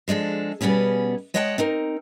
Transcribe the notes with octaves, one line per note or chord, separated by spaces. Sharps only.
F3 G#3 D4 A4
B2 G3 B3 C#4 G#4
G#3 C#5 D#5 F#5 G5 A5
C4 D#4 A#4